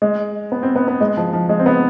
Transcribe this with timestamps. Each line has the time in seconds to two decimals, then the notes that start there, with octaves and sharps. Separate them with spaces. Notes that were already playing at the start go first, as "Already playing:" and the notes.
0.02 G#3
0.52 B3
0.63 C4
0.76 B3
0.88 B3
1.01 G#3
1.17 F3
1.33 F3
1.49 G#3
1.59 C4
1.66 B3